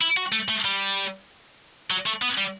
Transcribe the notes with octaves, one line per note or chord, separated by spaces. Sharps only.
E4
F#4
A3
A3
G3
F#3
A3
B3
G3